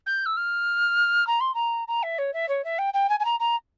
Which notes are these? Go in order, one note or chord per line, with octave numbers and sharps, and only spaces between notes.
G6
E6
F6
A#5
C6
A#5
A#5
E5
C#5
E5
C#5
E5
G5
G5
G#5
G#5
A#5
A#5